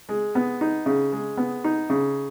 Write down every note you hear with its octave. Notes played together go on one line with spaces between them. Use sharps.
G#3
B3
D#4
C#3
G#3
B3
D#4
C#3